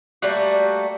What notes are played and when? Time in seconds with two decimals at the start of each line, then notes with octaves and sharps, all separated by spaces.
0.22 G3 A3 A#3 F#4